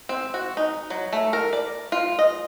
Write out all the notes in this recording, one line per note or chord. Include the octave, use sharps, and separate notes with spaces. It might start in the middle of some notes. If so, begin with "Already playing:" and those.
C4
F#4
D#4
F#3
A3
A#4
D5
F4
D#5